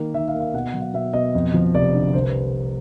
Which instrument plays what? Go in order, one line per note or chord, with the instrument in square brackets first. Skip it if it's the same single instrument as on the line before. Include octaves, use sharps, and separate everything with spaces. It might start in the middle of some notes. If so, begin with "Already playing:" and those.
Already playing: [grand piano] D#3 A#3
D#3 E5
F5
A#3
F5
B2 F#5
F#5
F#3
F5
B2 E5
B2 D#5
F2
F3
F1 D5
D3
C2 C5
B4